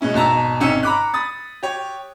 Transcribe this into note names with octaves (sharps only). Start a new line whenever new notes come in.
B2 G#3 C#4 E4
G#1 B2 A5 A#5 E6
G#1 C3 C#4 D#4 E6 C#7
A#5 B5 D6 F#6
B5 D#6 A6
G4 C#5